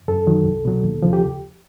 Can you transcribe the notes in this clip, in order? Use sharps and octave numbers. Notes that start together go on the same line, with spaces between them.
F#2 A4
D#3 F#3
C2
B2 F#3
D#2
C#3 F3
G4